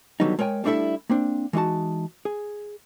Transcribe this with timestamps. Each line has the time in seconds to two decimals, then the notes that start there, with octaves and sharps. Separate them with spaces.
0.20 D3 D#3 F#3 G3 B3 D#4
0.39 G#3 A#4 C#5 G5 G#5
0.64 G3 A3 D4 E4 A4 E5
1.10 A#3 C4 D4
1.53 E3 G#3 D#4 F#4 A5
2.25 G#4